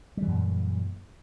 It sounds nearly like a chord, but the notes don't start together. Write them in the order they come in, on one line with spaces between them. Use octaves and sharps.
G3 E3 F#2 A#2